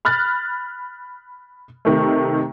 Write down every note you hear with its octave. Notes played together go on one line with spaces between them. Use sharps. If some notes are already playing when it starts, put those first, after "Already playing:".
B5 F6 F#6 A6
C3 D#3 A3